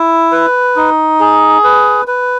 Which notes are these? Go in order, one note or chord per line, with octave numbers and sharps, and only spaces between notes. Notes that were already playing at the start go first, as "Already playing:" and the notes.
Already playing: E4
B4
D#4
G#4
B4
B4